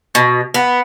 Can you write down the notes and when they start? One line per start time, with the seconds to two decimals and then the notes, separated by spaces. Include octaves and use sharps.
0.15 B2
0.54 B3